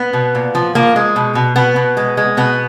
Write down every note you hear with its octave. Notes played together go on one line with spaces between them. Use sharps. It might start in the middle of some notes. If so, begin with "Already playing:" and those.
Already playing: B3
B2
A#2
F3
F3 A#3
G#3
B2
B2
B2 B3
B2
G#3
G#3
B2 B3